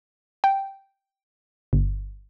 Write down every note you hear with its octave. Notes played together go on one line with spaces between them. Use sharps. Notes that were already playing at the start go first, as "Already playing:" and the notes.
G5
G1